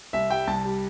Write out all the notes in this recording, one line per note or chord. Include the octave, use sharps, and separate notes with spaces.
C2 E5
G3 G5
C2 A5
G3